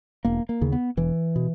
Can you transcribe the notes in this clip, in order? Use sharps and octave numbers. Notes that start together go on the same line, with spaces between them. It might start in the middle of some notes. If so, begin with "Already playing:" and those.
E1 A#3
A#3
D#2 C#3
B3
E1 E3
B2